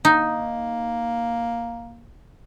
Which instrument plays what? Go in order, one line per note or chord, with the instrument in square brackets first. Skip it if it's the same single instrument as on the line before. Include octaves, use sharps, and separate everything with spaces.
[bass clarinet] A#3 [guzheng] D#4